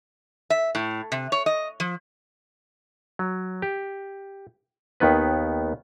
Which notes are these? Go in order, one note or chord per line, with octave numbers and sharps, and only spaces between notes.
E5
A2
C3
C#5
D#5
F3
F#3
G4
D#2 D#3 B3 B4